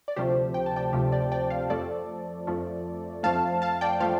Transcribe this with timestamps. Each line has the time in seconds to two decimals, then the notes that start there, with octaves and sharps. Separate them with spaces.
0.08 D5
0.16 D2 C3 F3 A3 G4 C5
0.54 G5
0.66 A5
0.76 D5 G5
0.93 D2 C3 F3 A3 G4
1.12 D5 G5
1.32 D5 G5
1.50 C5 F5
1.70 F2 F3 A3 A4 D5
2.47 F2 F3 A3
3.23 F2 F3 A3 F5 A5
3.62 F5 A5
3.81 D5 G5
4.00 F3 A3 C5 F5